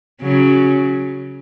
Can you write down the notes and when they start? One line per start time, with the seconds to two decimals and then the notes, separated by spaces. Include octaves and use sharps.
0.21 C#3 F#3